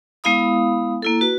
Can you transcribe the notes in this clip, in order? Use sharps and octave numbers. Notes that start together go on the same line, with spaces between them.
G#3 B3 E4 F5 B5 D#6
A#3 E4 A4
F#4 B4